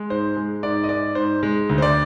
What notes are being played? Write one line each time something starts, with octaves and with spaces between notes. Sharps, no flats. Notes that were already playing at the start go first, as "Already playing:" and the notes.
Already playing: G#3
G#2 C5
G#3
G#2 D5
D#5
G#2 D5
G#2 C5
G#3
D2
C5
D5